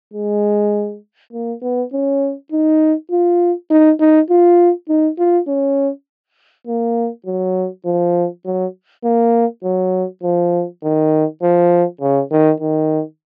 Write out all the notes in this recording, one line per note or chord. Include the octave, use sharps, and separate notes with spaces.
G#3
A#3
B3
C#4
D#4
F4
D#4
D#4
F4
D#4
F4
C#4
A#3
F#3
F3
F#3
A#3
F#3
F3
D#3
F3
C#3
D#3
D#3